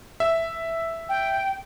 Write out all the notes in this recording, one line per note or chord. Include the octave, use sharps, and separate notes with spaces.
E5
G5